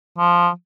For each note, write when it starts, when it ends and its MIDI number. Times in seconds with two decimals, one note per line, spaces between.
0.18 0.49 53